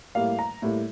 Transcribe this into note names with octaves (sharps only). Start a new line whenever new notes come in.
A2 G3 A#3 F5
A#5
A2 G3 A#3